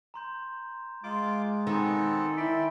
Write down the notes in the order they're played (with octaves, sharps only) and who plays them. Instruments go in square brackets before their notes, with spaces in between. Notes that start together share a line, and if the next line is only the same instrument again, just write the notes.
[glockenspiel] A#5 C6 G6
[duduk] G#3 [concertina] F4 D6 [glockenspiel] A#5 C6 A6
[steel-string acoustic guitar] D#3 [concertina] B3 C4 A4 [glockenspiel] G#5 A#5 D6
[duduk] E4 [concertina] A4 D5 G5 [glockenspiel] B6